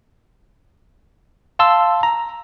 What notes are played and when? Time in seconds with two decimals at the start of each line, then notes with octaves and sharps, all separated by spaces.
1.59 F5 A5 C6 E6
2.03 A#5